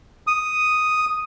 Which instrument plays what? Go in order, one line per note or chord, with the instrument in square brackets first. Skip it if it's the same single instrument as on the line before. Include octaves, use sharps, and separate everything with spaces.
[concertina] D#6